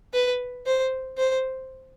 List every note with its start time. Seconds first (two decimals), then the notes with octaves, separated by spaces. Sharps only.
0.13 B4
0.66 C5
1.18 C5